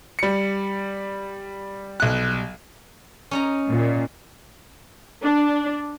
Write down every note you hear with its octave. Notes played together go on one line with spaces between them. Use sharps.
G3 C#7
B1 F#6
C#4 D#4 A#5
A#2
D4